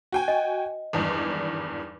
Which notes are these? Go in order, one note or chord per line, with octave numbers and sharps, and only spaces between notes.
F#4 G5 G#5
D#5
G#1 E2 G2